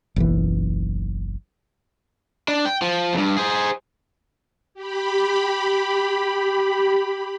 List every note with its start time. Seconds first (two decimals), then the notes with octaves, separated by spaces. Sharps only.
0.16 F#1 B1 E3
2.48 D4
2.65 G5
2.82 F3
3.14 E2 G2
3.37 G#4 C5
4.74 G4 B5